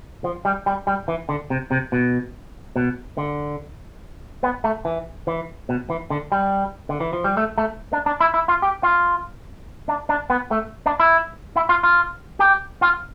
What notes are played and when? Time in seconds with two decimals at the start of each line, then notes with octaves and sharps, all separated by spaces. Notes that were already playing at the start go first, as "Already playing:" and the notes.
0.24 F3
0.45 G3
0.66 G3
0.87 G3
1.08 E3
1.29 D3
1.50 C3
1.71 C3
1.92 B2
2.76 B2
3.17 D3
4.43 B3
4.64 A3
4.85 E3
5.27 E3
5.69 B2
5.90 E3
6.10 D3
6.32 G3
6.89 D3
7.00 E3
7.13 F3
7.24 G3
7.37 A3
7.58 A3
7.93 D4
8.06 D4
8.20 E4
8.34 E4
8.48 F4
8.62 G4
8.83 F4
9.88 D4
10.09 D4
10.30 B3
10.51 A3
10.86 D4
11.00 E4
11.56 E4
11.69 F4
11.83 F4
12.39 G4
12.81 F4